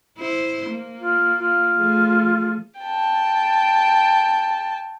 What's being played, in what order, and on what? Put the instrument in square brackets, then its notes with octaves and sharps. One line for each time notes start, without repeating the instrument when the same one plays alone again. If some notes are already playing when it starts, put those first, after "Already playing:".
[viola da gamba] E4 C5
A#3
[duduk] F4
F4
[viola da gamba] F3 A3 G#4
[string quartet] G5 A5